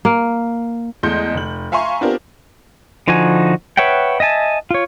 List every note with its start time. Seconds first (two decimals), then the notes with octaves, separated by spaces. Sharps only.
0.05 A#3
1.03 E2 G#3 A3 D#5 C6 G6
1.34 F1 F#7
1.72 E5 F5 G#5 A#5 C6 C#6
2.01 B3 C4 D4 F4 G4 A#4
3.08 D3 F3 D#4 F#4 G#5
3.77 B4 C#5 E5 F#5 G5
4.20 D#5 E5 G#5 A5
4.71 F4 C#5